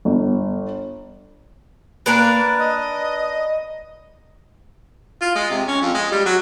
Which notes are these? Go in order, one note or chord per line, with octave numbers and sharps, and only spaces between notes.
G1
A#3 D4 A#4 B4
D#5
F4
G#3
C3
C#4
F2
G#3
G3
F#3